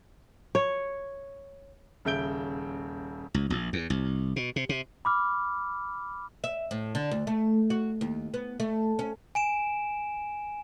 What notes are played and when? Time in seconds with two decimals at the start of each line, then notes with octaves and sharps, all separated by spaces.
0.55 C#5
2.05 D#1 C#3 E5 G6 D7 G7
3.34 C#2
3.50 A#1
3.73 E2
3.90 C2
4.36 B2
4.56 C3
4.69 C3
5.05 B5 D6 F6
6.44 E5
6.71 A2
6.95 D3
7.11 D2
7.27 A3
7.70 F#4
8.01 D#2
8.34 B3
8.60 A3
8.99 C#4
9.35 G#5 D7 E7